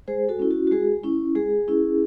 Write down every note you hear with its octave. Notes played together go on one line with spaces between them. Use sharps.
G#3 G#4 C5
F#4 A4
C#4 E4
F#4
F#4
G#3 G#4
C#4 E4
G#3 G#4
C#4 E4